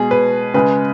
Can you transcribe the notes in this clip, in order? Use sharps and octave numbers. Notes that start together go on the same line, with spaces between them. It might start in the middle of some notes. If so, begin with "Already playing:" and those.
Already playing: B2 G#3 G#4
B4
C#3 G#3 B4